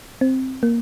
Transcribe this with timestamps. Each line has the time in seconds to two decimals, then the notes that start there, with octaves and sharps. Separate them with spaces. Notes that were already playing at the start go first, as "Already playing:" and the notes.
0.21 C4
0.63 A#3